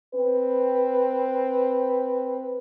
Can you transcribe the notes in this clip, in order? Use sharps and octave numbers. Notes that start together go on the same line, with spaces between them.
C4 B4